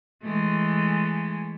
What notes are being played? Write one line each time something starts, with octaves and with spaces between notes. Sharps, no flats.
E3 G#3 A3